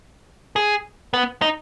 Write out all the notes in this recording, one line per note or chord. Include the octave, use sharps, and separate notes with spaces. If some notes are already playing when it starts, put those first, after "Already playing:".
G#4
B3
D#4